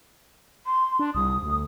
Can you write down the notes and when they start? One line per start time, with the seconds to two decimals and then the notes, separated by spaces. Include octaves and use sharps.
0.66 C6
0.99 D4
1.15 C2 D#6
1.43 D2